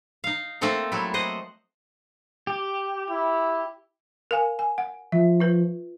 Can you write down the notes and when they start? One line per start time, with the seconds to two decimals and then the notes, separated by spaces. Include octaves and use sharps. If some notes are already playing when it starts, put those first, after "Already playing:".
0.24 D#4 F5
0.61 A3 A#3 C4 D#4 A4
0.92 F#3 G3 E4
1.14 C5 D#5 F#5
2.47 G4
3.10 E4
4.31 A#4 F5 G#5
4.59 G#5
4.78 F#5
5.12 F3 E5
5.40 F4 B4